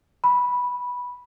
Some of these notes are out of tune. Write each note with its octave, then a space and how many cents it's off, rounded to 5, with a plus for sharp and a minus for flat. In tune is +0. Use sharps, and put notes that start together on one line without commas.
B5 -10